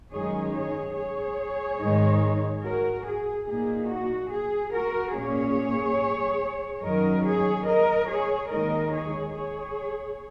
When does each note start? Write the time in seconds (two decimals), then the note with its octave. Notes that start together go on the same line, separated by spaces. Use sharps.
0.12 F#2 D#3 G#3 D#4 G#4 C#5
0.54 G#4 C#5
0.97 G#4 C#5
1.80 G#2 D#3 G#3 D#4
2.63 F#4 A#4
3.06 G#4
3.47 A#2 A#3 D#4 G#4
3.89 F#4
4.32 G#4
4.73 F#4 A#4
5.15 A#2 A#3 C#4 G#4 C#5
6.83 F#2 D#3 F#3 D#4 A#4 D#5
7.24 G#4 C#5
7.67 A#4 D#5
8.08 G#4 C#5
8.50 D#2 D#3 G#3 D#4 A#4 D#5
8.92 G#4 C#5
9.34 G#4 C#5